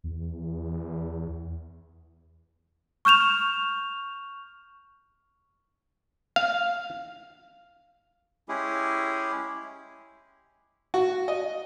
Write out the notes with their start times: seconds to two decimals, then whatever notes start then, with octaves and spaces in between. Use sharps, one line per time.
0.04 E2
3.05 C#6 F6 G6 E7 F7
6.36 F5
8.49 G#3 C#4 E4 G4 G#4
10.94 F#4
11.28 D#5